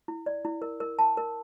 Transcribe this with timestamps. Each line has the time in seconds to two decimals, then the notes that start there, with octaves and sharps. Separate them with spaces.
0.08 E4
0.26 D5
0.45 E4
0.62 A#4
0.80 A#4
0.99 A5
1.17 A#4